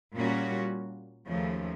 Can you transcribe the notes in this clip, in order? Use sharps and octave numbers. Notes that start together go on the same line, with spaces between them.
A#2 G3 A#3 C#4 F#4
D#2 C#3 F3 A3